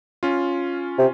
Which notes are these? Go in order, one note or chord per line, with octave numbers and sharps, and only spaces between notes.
C#4 F4
C3